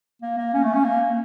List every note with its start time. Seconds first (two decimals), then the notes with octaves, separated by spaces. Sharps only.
0.22 A#3
0.38 A#3
0.53 C#4
0.64 A3
0.74 C#4
0.85 A#3